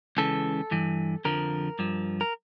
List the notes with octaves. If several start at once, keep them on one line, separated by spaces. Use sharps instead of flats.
C#2 C#3 E3 A4
G2 E3
F2 D3 F3 A#4
G2 F3
A#4